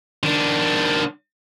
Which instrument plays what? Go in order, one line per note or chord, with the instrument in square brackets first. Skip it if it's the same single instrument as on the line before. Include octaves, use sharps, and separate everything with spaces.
[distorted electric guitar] D#3 D4